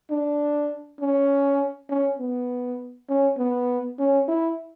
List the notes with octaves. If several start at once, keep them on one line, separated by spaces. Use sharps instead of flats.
D4
C#4
C#4
B3
C#4
B3
C#4
E4